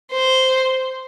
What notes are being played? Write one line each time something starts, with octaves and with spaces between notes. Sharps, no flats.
C5